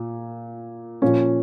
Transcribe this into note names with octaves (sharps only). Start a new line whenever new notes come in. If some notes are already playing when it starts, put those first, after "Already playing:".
Already playing: A#2
A#2 F3 C#4